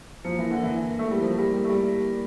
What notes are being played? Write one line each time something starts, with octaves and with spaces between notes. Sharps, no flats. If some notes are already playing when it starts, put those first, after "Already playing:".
F3 A#3
E3 A#4
D3
E4
E3
A#4
A#4
A3
A#4
G3
F3 A#4
G3 A#4
G3 A#4
A3
G3 D5
A#4
A#4